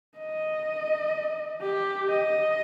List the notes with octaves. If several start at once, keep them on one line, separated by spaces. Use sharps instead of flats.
D#5
G4
D#5